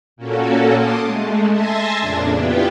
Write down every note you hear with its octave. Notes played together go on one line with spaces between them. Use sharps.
A#2 A#3 C#4 F#4 A4
A5 C6 D6 D#6
G#3 A3
E5 G#5 A5 C6 G#6 A#6
F2 A#2 C#3 D4
B3 E4 F4 G4 B4 G5